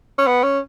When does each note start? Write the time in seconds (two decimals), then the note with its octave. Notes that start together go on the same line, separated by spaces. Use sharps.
0.18 C#4
0.27 B3
0.44 C#4